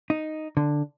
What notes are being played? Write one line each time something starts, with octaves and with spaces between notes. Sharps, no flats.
D#4
D3